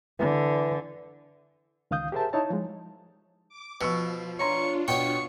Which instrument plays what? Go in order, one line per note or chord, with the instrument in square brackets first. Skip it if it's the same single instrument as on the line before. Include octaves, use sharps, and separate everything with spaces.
[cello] D3 [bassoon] E3
[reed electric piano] C#2 D#3 F5 D#6 G6
G4 G#4 A#4 C5 E5 A5
D#4 E4 C#5 A5
F3 G#3
[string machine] D6
[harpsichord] B2 [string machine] F3 [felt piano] C#6 E6 C#7
[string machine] D4 F4 [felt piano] C#5 A#5 C6 [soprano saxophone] C#6
[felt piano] B2 [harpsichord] C#5 G5 [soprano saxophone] C#6